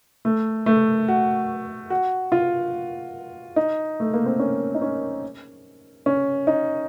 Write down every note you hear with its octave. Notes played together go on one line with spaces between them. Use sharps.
A3
A3
F#4
F#4
F4
D#4
A3
A#3
C4
C#4
D#4
C#4
C#4
D#4